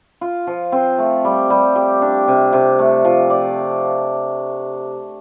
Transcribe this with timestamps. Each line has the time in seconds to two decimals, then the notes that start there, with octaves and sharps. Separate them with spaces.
0.21 F4
0.47 F3
0.72 C4
0.98 A3
1.24 G3
1.50 G3
1.76 G4
2.02 D4
2.28 C3
2.53 C3
2.79 A3
3.05 F3
3.30 D5